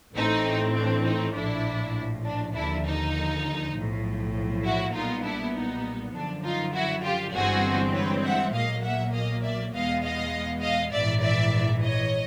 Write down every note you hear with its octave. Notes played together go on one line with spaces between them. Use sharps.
A1 A2 E3 A3 C4 D#4
D4
D#4
A#1 A2 F3 D4 E4
D4
D#2 D3 F3 D4 E4
D#4
B1 A2 F3
E4 F#4
B1 A#2 G3 B3 D#4 F4
D4 E4
D#4
F#2 D3 F3 D4
D#4 F4
E4 F#4
F4 G4
G1 G2 E3 G#3 C4 F#4 G#4
B4 C#5
E5 F#5
B1 A#2 F#3 A#3 D#5 F5
E5 F#5
D#5 F5
D5 E5
E2 B2 G#3 B3 D#5 F5
D#5 F5
D#5 F5
A#1 G#2 E3 D5 E5
D5 E5
C#5 D#5